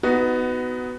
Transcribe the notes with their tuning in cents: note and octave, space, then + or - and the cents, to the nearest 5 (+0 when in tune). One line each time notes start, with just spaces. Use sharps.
B3 +15 D#4 +20 F#4 +0